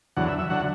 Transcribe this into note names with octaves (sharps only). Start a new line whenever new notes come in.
E2 D3 F#3 F#5
E5
E5
D3 F#3 F#5